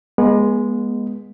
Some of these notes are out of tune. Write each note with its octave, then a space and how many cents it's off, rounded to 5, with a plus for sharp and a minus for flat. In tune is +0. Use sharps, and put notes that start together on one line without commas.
G#3 +0 B3 -35